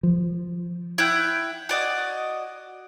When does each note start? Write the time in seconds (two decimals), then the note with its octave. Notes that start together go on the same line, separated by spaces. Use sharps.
0.03 F3
0.98 E4 F#5 G5
1.69 F#4 D5 D#5